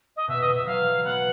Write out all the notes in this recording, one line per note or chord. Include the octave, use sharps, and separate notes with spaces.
D#5
B2 E5
D#5
B2
E5
F#3 F5
F#3
B3 F#5